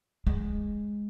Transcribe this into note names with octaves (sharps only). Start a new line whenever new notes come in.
G#3